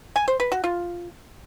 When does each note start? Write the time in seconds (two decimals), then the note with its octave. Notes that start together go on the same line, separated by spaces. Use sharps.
0.16 G#5
0.28 C5
0.40 B4
0.52 F#4
0.64 F4